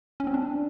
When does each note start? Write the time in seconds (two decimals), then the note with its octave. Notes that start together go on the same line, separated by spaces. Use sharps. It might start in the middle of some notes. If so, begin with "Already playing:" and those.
0.20 C#4
0.27 C4
0.34 D4